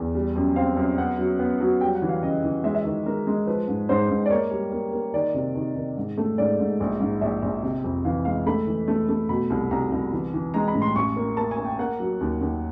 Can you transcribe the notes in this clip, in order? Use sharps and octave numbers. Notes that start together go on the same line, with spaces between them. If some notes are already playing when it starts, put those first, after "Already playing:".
Already playing: E2
G3
F#2
C4 F5
F#2
B3 F#5
F#3
B3
F#3
G3 G5
F#5
E3
F5
C#3 D#5
E3
G#3 E5
E5
D#3
G#3 A#4
G#3
F3 B4
G#2
G#2 C5
G#2
D5
A#3 C#5
G3
A#3
A#3
D#3 D5
C3
D#3
D#3
G#2
A3
G#2 D5
G#2
A#1
G#2
A#1 E5
A#1
C3
F2
E3 F5
G#3 F5
A3 B5
E3
A3
A3
B2 B5
C2
C2 A#5
C2
E3
E3
G#3 A#5
B5
A2
C6
A1 C#6
A#3
A#3 A5
G#5
A#3
G5
A#3 F#5
F#3
D#2
D#2